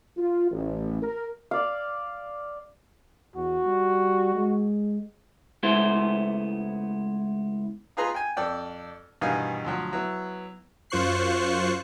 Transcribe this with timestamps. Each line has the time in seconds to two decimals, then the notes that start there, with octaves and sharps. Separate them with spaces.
0.17 F4
0.51 A1
1.02 A#4
1.51 D5 F5
3.36 E2 F#4
3.65 G3
4.36 G#3
5.63 C#2 G#3 A3 B3 E4 C5
7.97 D#4 F4 G#4 B4 A#5 C6
8.14 G5 G#5
8.37 F2 A4 D5 G5
9.21 G2 B2 D#3 E3 F5 G#5
9.65 D2 F3 F#3
9.93 F#3 B3 E4
10.90 F#2 F4 C5 C#6 F#6 C7